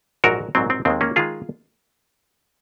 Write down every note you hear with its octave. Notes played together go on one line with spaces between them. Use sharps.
A#1 G#2 F#3 F#4 A#4
A#1 G#2 F#3 C4
C4
D#2 D#3 G#3 C4
A#3 C#4
D#3 G#3 F4 G#4